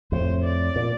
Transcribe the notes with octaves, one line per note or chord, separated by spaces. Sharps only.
F2 A2 C5
D5
A#2